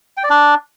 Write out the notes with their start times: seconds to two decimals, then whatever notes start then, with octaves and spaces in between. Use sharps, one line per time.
0.17 G5
0.24 D5
0.30 D4